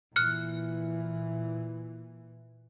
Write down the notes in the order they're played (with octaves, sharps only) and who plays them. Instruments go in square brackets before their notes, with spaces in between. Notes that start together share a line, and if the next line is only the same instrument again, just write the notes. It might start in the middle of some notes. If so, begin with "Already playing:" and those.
[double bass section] A#2 E3 [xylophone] F6 F#6 C#7